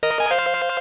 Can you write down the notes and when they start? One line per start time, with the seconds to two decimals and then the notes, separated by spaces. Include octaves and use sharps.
0.03 A#4 D#5
0.20 G#5
0.31 C5 F5